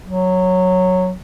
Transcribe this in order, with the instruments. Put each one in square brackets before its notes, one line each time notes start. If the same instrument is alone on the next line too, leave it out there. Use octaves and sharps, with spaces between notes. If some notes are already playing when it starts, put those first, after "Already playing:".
[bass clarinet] F#3